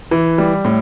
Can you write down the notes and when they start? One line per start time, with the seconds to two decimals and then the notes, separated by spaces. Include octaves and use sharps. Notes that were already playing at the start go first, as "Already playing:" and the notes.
0.11 E3
0.38 G3
0.65 A2